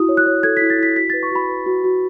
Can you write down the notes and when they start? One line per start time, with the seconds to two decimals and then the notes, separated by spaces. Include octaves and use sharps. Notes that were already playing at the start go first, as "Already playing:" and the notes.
Already playing: E4 F#4 D#6
0.09 C#5
0.17 F#6
0.26 C#5
0.43 A4 G#6
0.57 B6
0.62 E4
0.70 A6
0.79 E4 B6
0.96 F#4 B6
1.10 B4 A6
1.23 C#6
1.31 F#4 B5
1.49 B4
1.66 F#4
1.84 F#4